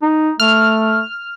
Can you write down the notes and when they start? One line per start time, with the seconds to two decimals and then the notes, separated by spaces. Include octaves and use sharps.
0.02 D#4
0.40 A3 F6